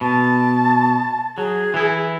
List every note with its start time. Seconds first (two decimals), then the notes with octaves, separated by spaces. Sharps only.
0.01 B2 A5
1.38 F#3 G#4
1.74 E3 E4